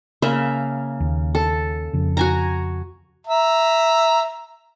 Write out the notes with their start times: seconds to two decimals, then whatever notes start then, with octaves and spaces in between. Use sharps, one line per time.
0.22 C#3 A#3 E5
1.00 D#2
1.35 A4
1.93 F2 C#3
2.17 F#4 G#5 A#5
3.27 E5 A#5